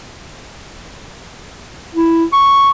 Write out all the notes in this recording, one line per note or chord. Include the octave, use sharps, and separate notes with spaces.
E4
C#6